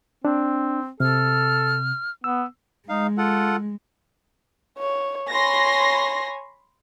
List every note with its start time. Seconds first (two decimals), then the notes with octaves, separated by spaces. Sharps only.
0.25 C4 D4
1.00 C3 A4 F6
2.24 B3 E6
2.89 G#3 D#4 F5
3.18 F4 A4 F#5
4.78 C#5
5.29 C#5 G#5 B5 C6 A#6